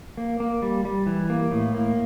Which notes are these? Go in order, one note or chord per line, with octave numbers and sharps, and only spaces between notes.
A#3
A#3
G3
G3
E3
A#3
A2
A#3